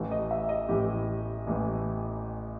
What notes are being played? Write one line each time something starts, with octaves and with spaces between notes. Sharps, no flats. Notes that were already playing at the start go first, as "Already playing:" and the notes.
Already playing: A1 A2 E3 A3
D#5
E5
D#5
A1 A2 E3 A3 G4
A1 A2 E3 A3